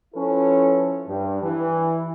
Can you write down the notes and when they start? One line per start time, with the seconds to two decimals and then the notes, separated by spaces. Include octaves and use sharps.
0.15 F3 C#4 E4 A4 B4
1.07 G2
1.42 E3